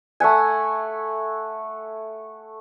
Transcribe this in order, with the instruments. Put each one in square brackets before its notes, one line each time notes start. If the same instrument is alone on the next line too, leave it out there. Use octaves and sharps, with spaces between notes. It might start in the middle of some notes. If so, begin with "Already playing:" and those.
[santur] A3 E5 F#5 G#5